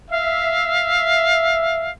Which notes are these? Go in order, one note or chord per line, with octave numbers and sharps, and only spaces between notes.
E5 F5